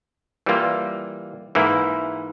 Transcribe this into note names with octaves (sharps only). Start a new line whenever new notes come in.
E3 G3 A#3 F4
G#2 E3 A#3 E4